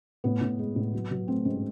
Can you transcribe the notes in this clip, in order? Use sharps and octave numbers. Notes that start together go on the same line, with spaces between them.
A2 B3
A2
G#3
A2
F#3
F#3
A3 C4
G#2 C#4